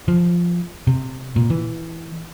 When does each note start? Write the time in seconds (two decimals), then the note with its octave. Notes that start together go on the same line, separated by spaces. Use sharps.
0.08 F3
0.87 C3
1.36 A#2
1.50 E3